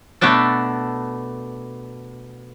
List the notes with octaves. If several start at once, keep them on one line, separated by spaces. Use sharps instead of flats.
B2 A3 B3 D4 A4